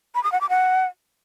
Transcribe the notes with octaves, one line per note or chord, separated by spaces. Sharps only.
B5
D#6
F#5
D6
F#5